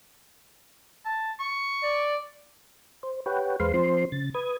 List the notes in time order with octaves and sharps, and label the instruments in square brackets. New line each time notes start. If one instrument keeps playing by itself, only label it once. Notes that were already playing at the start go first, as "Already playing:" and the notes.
[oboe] A5
C#6
[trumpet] D5
[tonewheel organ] C5
G4 B4 C#5 F#5 G5
E2 G#3 B4 C5 F5 C6
F3 C4 C5 C6
C#3 A6
B4 D#6 G#6